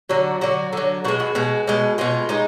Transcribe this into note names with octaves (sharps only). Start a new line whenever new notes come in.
D3 F#3 F#4
D3 F#3 F#4
D3 F#3
B2 G#3 F#4
F#4
B2 G#3
B2 G#3
B2 G#3 F4
G#3 D#4